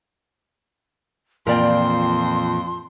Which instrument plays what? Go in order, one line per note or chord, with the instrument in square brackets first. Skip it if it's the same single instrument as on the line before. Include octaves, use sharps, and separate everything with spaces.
[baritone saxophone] F2 [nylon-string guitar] A#2 E3 [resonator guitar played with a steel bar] A#4 D5 G5 [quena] C6